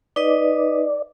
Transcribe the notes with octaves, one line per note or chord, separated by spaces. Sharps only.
D#4 B4 D5 D#5